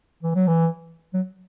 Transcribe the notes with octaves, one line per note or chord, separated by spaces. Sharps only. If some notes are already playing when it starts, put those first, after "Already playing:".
E3
F#3
E3
F#3